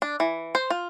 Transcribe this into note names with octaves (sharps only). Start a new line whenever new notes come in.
D4
E3
C5
F4